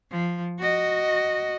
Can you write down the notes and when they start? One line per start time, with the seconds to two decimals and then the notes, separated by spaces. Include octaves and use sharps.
0.10 F3
0.59 F#4 D#5